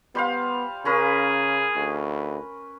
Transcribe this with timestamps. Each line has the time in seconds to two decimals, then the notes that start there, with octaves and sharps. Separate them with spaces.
0.15 G3 B3 C5 F5
0.85 C#3 C#4 G#4 A#4 B4
1.76 D2